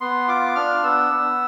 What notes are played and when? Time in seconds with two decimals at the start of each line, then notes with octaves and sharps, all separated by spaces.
0.01 B3 C6
0.28 F4 D6
0.55 D4 F6
0.83 B3 E6
1.11 B3